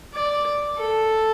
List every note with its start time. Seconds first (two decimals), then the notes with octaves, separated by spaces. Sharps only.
0.14 D5
0.78 A4